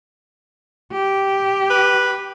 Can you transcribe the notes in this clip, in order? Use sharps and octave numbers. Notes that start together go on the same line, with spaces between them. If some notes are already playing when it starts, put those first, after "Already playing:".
G4
B4